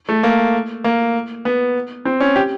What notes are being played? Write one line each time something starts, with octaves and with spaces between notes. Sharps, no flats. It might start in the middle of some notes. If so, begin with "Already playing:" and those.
A3
A#3
A#3
B3
C4
C#4
G4